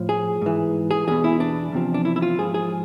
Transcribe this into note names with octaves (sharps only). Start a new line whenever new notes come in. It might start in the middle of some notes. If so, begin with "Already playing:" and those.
Already playing: A2 F3
G#4
G#2 E3
G#4
E2 B2 G#4
E4
D4
E2 C3 F3
D4
E4
E4
F4
G#2 F3 G#4
G#4